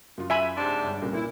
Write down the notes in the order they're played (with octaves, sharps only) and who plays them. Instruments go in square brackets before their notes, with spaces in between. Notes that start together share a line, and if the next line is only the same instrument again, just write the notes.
[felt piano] F#2 F4
[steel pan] E5 G#5 B5
[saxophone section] G#2 C3 D4 [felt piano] C6
[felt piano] G1
C2 A#2 C#3
[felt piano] A#2 [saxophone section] E4